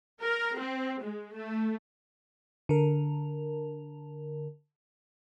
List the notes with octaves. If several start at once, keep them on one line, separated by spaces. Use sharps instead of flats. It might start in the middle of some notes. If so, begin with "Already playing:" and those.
A#4
C4
G#3
A3
D3 A#4